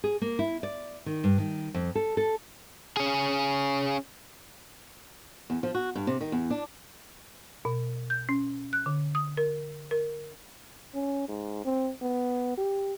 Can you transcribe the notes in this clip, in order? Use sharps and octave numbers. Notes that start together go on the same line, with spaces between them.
G#4
A#3
E4
D5
D#3
G2
D#3
F2
A4
A4
C#4 G#4
E2
F3
F#4
G2
C3
D#3
E2
D4
B2
G6
C#4
F#6
D3
D#6
A#4
A#4
C#4
G#2
C4
B3
G4